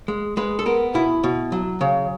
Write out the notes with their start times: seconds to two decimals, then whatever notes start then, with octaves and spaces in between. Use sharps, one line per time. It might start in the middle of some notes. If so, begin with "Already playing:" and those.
0.08 G#3
0.37 G#3 B4
0.59 A4
0.66 B3 A#4
0.94 B2 E4
1.24 B2
1.52 F#3
1.81 C#3